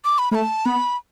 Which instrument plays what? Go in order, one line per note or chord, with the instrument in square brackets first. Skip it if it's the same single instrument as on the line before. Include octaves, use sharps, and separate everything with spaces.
[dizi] D6
B5
[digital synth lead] A3 [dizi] B5
[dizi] A5
[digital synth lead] B3 [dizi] B5